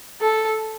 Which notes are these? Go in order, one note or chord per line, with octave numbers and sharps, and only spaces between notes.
A4